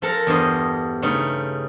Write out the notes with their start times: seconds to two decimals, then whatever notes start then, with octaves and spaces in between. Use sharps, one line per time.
0.02 F3 A4 A#4 A#5
0.27 E2 G2 C5 D#5
1.02 G2 C#3 A3 D#4